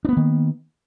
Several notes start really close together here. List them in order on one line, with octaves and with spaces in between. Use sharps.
D4 B3 A#3 D#3